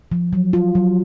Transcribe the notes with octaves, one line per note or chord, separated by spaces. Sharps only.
F3
F#3
F4
F#3